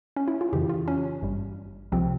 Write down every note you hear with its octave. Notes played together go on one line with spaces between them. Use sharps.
C#4
E4
F4
F2 C#3 E3 G4
F4
C#4
G#1 G2 G3
C2 C3 F3 C4